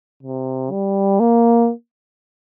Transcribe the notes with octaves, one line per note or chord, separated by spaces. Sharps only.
C3
G3
A#3